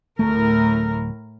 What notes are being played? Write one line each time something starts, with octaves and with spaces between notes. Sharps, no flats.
D1 A2 A3 A#4